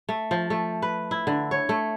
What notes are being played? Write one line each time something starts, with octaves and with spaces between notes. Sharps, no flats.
A3
F3
A3
B4
E4
D3
C#5
A3